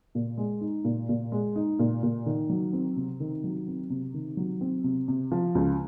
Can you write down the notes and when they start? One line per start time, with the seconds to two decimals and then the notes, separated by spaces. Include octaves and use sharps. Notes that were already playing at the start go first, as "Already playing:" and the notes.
0.15 A#2
0.38 G#3
0.61 D#4
0.84 A#2
1.09 A#2
1.32 G#3
1.56 D#4
1.79 A#2
2.03 A#2
2.26 D#3
2.50 F#3
2.73 C4
2.96 C3
3.20 D#3
3.44 F#3
3.67 C4
3.90 C3
4.14 D#3
4.37 F#3
4.61 C4
4.84 C3
5.08 C3
5.32 F3
5.55 C#2